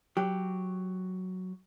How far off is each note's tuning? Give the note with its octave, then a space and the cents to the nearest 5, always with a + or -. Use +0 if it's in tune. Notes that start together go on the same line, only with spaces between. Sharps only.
F#3 +0 G4 +0